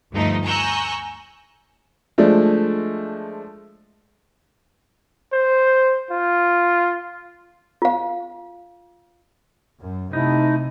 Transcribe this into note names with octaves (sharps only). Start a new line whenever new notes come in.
D2 G2 F3 A3 D#4
G#5 A#5 C#6 E6 F#6 G6
F3 G#3 A3 D4
C5
F4
F4 F5
F#2
C3 A3 D#4 E4